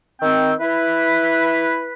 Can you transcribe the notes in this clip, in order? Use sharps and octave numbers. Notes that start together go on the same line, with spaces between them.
D#3 C4 G5 E6
E4 B4